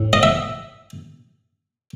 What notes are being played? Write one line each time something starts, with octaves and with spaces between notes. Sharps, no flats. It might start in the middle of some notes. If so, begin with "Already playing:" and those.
Already playing: A2
D#5
E5